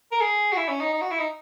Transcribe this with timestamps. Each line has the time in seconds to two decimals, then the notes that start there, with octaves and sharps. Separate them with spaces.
0.12 A#4
0.21 G#4
0.53 F#4
0.57 E4
0.68 C#4
0.81 D#4
0.93 D#4
1.02 F#4
1.11 E4
1.19 D#4